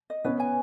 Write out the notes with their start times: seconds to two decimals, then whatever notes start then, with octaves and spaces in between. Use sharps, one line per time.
0.10 D#5
0.24 B3 C#4 B4
0.40 G#5